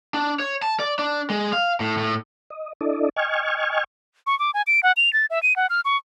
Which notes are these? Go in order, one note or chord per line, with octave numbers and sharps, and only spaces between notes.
D4
C#5
A5
D5
D4
G#3
F5
A2
A2
D#5
D4 E4 A4 D5 D#5
D#5 G5 G#5 C#6 F6 G#6
C#6
D6
G#5
D7
F#5
F7
A6
E5
D#7
F#5
F6
C#6